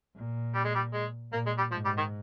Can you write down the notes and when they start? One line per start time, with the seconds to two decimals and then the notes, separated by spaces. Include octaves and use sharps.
0.16 A#2
0.54 G3
0.64 G#3
0.75 G3
0.93 G#3
1.32 A#2 A#3
1.46 G#3
1.58 G3
1.71 G#2 F3
1.85 G3
1.98 D#3